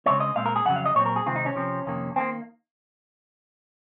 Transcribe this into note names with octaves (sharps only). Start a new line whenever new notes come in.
C#3 G#3 C4 C#5
D#5
A#2 G#3 C4 F5
A#4
G#4
F2 C#3 F#3 F#5
F5
D#5
A#2 F#3 C4 C#5
A#4
G#4
C3 D#3 G#3 C4 F4
D#4
C#4
C3 F3 C4
F2 C3 D#3 A#3
D#3 A#3 C4